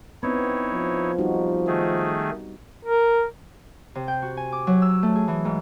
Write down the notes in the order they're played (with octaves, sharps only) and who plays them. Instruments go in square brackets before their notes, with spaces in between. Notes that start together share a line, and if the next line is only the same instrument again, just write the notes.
[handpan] B3 C4 [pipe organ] D#4 E4 C#5
[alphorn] F3
[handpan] G3 D#4 F#4
[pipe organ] D#3 A3 G#4
[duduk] A#4
[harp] C3
G5
F#4
G#5
D6
F#3
E6
A3
G#4
E3
G#2